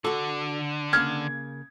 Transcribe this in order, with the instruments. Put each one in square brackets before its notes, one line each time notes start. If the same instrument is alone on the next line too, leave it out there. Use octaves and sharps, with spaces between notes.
[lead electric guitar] D3 [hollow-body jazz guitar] F#4 A4
[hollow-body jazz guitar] C#3 A#3 [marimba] F6 [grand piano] G#6